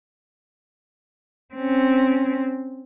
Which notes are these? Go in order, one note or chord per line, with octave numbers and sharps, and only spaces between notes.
C4 C#4